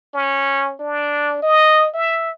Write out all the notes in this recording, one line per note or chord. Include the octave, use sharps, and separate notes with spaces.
C#4
D4
D#5
E5